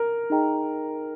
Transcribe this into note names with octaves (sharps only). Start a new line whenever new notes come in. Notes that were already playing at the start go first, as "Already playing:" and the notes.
Already playing: A#4
D#4 G#4 D#5 G5 A#5